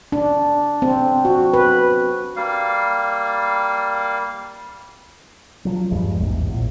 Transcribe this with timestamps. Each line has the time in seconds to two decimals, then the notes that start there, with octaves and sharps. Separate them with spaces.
0.12 D4
0.82 C4
1.25 F#4
1.54 B4
2.36 G3 A#3 F5
5.65 F3 F#3
5.91 E2 G2 G3 G#3
6.20 A1 E2 G#2
6.47 A#1 E2 A#2